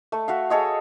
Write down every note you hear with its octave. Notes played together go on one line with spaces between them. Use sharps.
A3
F#4 E5 F5
G#4 A4 C#5 D#5